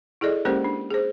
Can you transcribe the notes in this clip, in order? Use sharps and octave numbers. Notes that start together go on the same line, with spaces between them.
E4 G#4 A4 D5 D#5
G#3 A#3 C#4 G4 A#4 C5
D4
G#4 C5